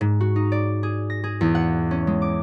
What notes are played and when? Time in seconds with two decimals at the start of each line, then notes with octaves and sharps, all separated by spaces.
0.01 G#2
0.21 F#4
0.36 D#4
0.52 D5
0.83 G#4
1.10 A#6
1.24 G#4
1.41 E2
1.55 F#5
1.91 C#4
2.07 G#3
2.22 D6